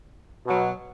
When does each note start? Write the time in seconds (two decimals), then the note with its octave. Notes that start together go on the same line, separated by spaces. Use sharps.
0.45 B2 F#3